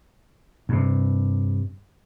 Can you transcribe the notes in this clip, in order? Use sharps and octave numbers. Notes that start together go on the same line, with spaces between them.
G2 C3